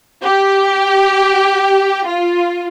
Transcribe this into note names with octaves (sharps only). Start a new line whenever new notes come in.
G4
F4